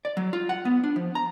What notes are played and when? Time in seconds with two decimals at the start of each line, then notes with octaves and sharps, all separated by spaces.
0.05 D5
0.17 F#3
0.33 F4
0.49 F#5
0.65 B3
0.84 D4
0.96 F3
1.15 A#5